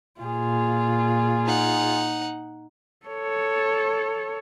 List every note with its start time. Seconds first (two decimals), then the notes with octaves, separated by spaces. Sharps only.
0.20 A#2 F4 G#4
1.46 D#4 F#5
3.06 A4 C#5